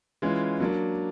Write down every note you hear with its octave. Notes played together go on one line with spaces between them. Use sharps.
E3 G#3 C#4 F4
F#3 A#3 D4